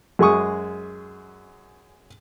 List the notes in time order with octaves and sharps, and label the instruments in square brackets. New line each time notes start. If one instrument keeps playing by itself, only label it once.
[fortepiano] F#2 G#3 G#4 C#6 D#6